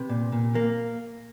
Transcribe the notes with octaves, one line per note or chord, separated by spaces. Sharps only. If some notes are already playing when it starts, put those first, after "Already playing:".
Already playing: C3 B4
A#2
A#2
A#3